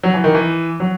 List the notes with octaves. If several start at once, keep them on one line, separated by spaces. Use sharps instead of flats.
F#3
E3
D#3
E3
F#3